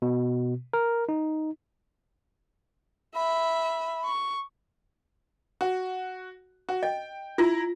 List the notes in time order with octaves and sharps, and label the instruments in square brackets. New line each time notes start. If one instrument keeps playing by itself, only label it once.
[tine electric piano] B2
A#4
D#4
[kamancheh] E5 [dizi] B5
[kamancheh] C#6
[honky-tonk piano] F#4
F#4
[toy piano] D#5 [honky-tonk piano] G5
[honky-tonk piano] E4 A#5 A#6 [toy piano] F4